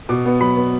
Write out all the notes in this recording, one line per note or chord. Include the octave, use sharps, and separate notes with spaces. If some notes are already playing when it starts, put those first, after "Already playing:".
B2 D6
B3
F#3 B5
B3